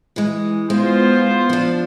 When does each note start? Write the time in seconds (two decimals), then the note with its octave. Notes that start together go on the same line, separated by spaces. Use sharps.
0.16 E3 G#3
0.70 G#3 B3 F4 C5
1.49 F3 D4